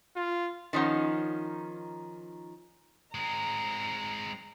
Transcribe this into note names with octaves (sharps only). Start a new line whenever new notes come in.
F4
D#3 F3 C#4 D#4 F#5
G#3 C4 A#5